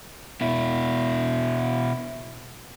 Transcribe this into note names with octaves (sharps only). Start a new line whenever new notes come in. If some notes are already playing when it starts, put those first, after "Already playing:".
B2 E4